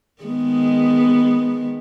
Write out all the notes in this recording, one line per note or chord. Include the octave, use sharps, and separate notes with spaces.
D#3 G#3 B3